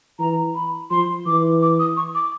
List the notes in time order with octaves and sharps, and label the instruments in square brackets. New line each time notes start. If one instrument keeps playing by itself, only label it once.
[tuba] E3 [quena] A#5
[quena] B5
[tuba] F3 [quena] C6
[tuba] E3 [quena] D6
[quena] D6
D#6
C#6
D6